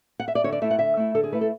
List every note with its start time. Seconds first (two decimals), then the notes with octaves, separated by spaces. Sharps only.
0.20 F#5
0.28 E5
0.35 D5
0.44 D3 C#5
0.52 D5
0.62 A3 E4 E5
0.71 F#5
0.79 D3 E5
0.97 A3 E4
1.15 D3 A4
1.24 G#4
1.33 A3 E4 B4
1.41 A4